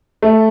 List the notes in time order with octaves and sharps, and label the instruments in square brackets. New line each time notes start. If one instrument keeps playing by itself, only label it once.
[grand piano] A3